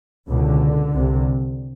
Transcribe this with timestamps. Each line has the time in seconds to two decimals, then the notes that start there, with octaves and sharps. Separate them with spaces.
0.28 C#2 B2 D3
0.94 C2 C3